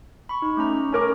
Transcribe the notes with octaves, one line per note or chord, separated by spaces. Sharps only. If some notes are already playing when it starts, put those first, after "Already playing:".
B5 C#6
D#4
A3 C#4 A#5
A3
C#4 A#4 D6